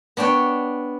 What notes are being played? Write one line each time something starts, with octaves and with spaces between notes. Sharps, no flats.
B3 D4 C#5 G5